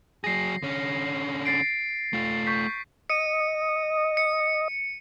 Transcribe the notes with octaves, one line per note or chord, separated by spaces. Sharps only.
F#3 G#4 A#6 C7
D3 C#4
A6 C7 D7
A3 F4
C#6 G6 B6
D#5 C#7 D#7
C#7